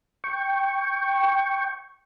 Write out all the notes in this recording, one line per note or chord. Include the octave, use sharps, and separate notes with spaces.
G5 C#6